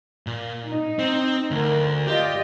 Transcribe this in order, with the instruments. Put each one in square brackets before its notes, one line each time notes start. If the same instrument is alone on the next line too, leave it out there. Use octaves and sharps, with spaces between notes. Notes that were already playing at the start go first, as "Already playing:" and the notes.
[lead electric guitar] A#2
[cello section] D#4
[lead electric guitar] C4
[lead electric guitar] D2 [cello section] A#4
[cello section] F4 D5 D#5 [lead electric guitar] G4